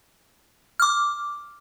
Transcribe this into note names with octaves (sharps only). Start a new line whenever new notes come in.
D6 F6